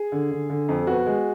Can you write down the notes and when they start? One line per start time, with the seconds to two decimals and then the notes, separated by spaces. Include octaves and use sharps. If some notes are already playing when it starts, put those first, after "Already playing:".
Already playing: G#4
0.12 D3
0.31 D3
0.50 D3
0.69 F2
0.87 B3 F#4
1.07 G#3